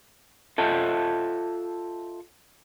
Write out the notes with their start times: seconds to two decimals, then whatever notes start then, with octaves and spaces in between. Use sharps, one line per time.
0.58 F4 A4 D#5 E5 A5